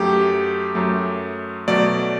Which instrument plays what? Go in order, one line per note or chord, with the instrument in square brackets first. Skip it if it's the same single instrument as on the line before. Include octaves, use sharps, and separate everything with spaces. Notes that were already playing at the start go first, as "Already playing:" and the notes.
Already playing: [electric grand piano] F#2 F#3 A3 G4
F#2 F#3 A3
B2 F#3 A3 D5